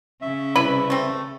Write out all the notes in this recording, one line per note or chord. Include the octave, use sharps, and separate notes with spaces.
C#3 C#4 E5
C2 E4 B4 D5 B5
A3 C4